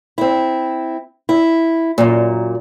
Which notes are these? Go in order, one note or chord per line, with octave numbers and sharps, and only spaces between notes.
C4 E4
E4
F#2 A#2